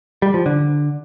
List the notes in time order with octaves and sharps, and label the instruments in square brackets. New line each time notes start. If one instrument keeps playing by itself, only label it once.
[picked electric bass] G3
F3
D3